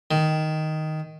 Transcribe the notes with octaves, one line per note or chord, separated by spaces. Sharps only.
D#3